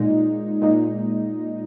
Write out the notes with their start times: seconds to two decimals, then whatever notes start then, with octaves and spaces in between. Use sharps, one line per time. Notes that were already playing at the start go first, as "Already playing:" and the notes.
Already playing: A#2 G#3 D#4
0.62 A#2 G#3 D#4